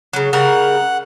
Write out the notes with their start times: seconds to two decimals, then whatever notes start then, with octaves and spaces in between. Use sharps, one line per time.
0.13 C#3 F#3
0.33 C#3 G3 A#4 F#5